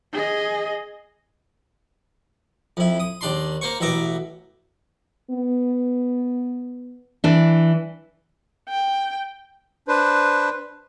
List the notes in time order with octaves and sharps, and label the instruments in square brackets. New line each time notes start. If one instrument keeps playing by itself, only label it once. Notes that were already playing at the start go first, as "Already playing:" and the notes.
[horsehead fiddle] G#4 D#5
[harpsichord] F2 E4
D#6
D#2 D4 C6
A#3 C5 C#6
A1 B2 E5 A#5 D6
[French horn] B3
[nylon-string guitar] E3 D4
[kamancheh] G5
[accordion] D4 B4 C5